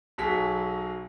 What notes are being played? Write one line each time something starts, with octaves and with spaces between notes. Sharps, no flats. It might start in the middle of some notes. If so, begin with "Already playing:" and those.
B1 F#3 G#4 B6